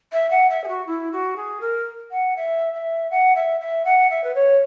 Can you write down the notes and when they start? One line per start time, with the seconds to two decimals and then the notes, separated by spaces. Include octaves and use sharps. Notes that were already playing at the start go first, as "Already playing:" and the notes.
0.12 E5
0.30 F#5
0.50 E5
0.64 G#4
0.68 F#4
0.87 E4
1.12 F#4
1.36 G#4
1.61 A#4
2.11 F#5
2.37 E5
2.74 E5
3.11 F#5
3.35 E5
3.61 E5
3.85 F#5
4.10 E5
4.24 B4
4.35 C#5